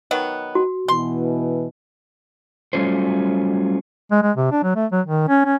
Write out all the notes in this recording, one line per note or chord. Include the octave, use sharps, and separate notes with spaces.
D#3 F#3 B3
F#4
B2 E3 C6
F#3 G3 A3 C#4 F4 C5
G#3
G#3
C3
D4
F#3
A3
F#3
D#3
C#4
C#4